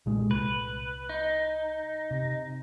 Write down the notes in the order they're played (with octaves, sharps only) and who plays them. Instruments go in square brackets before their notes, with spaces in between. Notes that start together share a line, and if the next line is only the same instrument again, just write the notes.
[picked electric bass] B1 A#2 G#3
[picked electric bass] C2 [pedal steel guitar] B4
[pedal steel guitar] D#4
[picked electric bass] C3